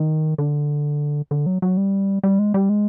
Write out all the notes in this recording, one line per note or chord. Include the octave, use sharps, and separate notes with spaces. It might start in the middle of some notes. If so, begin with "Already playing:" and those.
Already playing: D#3
D3
D3
F#3
F#3
G3
G3
G#3
G3
G#3